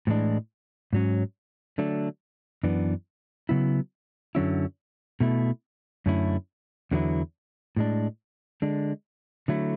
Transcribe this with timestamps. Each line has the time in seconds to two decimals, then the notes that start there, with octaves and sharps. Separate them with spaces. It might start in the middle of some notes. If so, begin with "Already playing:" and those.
0.07 A2 E3 G#3 D4
0.93 G#2 F#3 C#4
1.78 D3 F#3 A3 D4
2.63 F#2 E3 B3 D4
3.49 C#3 F#3 B3 E4
4.35 F#2 D3 F#3 C#4 E4
5.20 B2 A3 E4
6.06 F#2 D3 A3 C#4 E4
6.91 E2 D3 F#3 B3 E4
7.76 A2 G#3 D4
8.62 D3 G#3 D4
9.48 D3 F#3 A3 E4